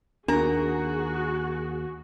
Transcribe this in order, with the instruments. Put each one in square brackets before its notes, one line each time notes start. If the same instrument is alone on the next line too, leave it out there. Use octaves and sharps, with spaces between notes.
[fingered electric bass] D#2 [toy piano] D4 [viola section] F#4 G#4 [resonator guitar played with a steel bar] A#4